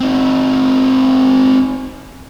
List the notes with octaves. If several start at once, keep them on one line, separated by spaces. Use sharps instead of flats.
C4 D#4